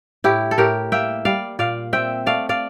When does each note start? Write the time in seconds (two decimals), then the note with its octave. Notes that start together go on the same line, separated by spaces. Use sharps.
0.24 A2 E4 G4
0.51 A4
0.58 A2 G4 A#4
0.92 A#3 E5 G5
1.25 G3 D5 F5
1.59 A#2 D5 F5
1.93 C4 E5 G5
2.26 A3 D5 F5
2.49 D5 F5